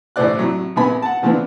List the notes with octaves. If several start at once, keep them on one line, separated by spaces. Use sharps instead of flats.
A1 E3 A3 C5 D5 F#6
A2 C3 F#3
A#1 F2 C3 B3 G#5 B5
F#5 A5
C#3 E3 F3 B3 C4 D4